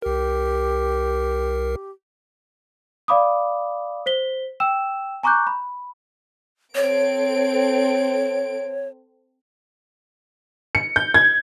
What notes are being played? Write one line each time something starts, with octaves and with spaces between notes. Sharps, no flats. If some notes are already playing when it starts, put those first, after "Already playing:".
C2 G4 A#4
D5 F5 B5 D6 D#6
C5 B6 G7
G5 E6 E7
G#5 A#5 C#6 D6 F#6 G6
B5
C4 A4 C#5 D7
C#7
G6
G#6